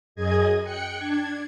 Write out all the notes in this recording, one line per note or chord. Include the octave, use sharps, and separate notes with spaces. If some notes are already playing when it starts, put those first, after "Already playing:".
F#2 G#4 D#5 G#6
G5 F#6 C#7
D4 G#6